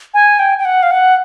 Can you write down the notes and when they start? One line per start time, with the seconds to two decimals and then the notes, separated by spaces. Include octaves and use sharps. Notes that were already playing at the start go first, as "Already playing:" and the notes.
0.14 G#5
0.39 G5
0.58 G5
0.65 F#5
0.83 F5
0.91 F#5